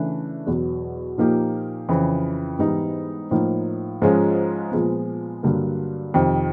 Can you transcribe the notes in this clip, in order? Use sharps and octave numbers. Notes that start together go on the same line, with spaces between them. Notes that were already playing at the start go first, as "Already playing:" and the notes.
Already playing: C#3 E3 A3 D4
E2 B2 F#3
A#2 F3 A#3 D#4 G4
F2 C#3 E3
G#2 E3 G3 B3 D#4
A2 F3 A#3 D#4
G#2 F3 G#3 C#4 F4
A#2 F3 G#3 B3
G2 D3 F#3 A#3
F2 C3 D#3